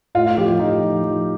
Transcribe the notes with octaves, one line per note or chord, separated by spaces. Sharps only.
A2 F4
F4
F3 G4
F4
F3 D#4
F3
F3